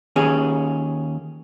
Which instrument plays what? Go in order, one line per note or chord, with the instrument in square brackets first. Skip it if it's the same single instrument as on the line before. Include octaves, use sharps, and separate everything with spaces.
[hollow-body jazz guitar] D#2 C#4 G#4